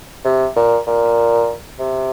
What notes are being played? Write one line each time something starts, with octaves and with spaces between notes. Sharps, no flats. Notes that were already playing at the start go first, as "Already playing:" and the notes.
C3
A#2
A#2
C3